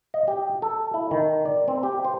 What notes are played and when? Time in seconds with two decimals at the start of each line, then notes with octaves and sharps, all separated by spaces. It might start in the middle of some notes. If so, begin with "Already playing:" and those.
0.14 D#5
0.28 G4
0.62 A4
0.94 E4
1.11 D#3
1.45 D5
1.68 C4
1.83 G4
2.05 C5